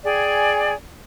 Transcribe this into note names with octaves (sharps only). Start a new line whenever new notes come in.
G#4 D5 G5 G#5